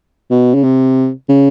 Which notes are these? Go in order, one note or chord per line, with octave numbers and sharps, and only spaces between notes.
B2
C#3
C3
C#3